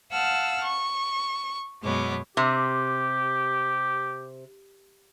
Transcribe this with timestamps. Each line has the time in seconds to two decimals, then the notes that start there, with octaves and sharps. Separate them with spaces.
0.11 F5 F#5 A5 E6 F6
0.63 C#6
1.82 F#2 B2 G#3 B3 C#5 D6
2.37 C3 G4